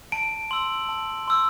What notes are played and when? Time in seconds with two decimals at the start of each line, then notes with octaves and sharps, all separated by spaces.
0.12 A5 D7
0.51 C6 E6 F#7
0.89 A5
1.27 C6 E6